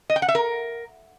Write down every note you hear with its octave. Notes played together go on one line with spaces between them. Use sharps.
D#5
G5
F#5
E5
A#4